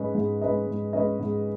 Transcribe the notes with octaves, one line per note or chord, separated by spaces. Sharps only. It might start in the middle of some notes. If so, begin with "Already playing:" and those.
Already playing: G#2 G#3 C#4 B4 D#5
G#2
G#3 C#4 B4 D#5
G#2
G#3 C#4 B4 D#5
G#2